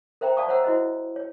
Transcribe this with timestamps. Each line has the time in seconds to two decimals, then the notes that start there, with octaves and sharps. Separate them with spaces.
0.21 A#4 C5 E5 G5 A#5
0.37 D5 E5 F5 A5 C#6 D#6
0.49 C5 C#5 E5 F#5 A#5 E6
0.64 E4 F#4 C5 D#5
1.16 C#5